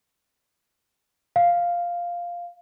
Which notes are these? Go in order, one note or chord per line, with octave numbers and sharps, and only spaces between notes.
F5